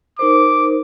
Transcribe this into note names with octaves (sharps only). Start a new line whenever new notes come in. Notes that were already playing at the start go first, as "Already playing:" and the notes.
D#4 A#4 C5 D6